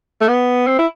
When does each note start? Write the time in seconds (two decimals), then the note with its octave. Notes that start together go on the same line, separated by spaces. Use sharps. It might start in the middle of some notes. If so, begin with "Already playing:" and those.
0.21 A3
0.28 B3
0.67 C4
0.79 E4